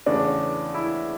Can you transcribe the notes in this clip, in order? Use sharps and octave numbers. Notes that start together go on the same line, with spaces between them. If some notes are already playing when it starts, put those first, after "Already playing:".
E2 C#3 E3 A3 C#4 D4
E4